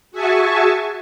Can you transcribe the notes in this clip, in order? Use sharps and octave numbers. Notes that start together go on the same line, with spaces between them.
F#4 G#4 E5 G#5 A5 C#6